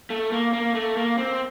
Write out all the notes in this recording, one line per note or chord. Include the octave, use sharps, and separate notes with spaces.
A3
A#3
A#3
A3
A#3
C4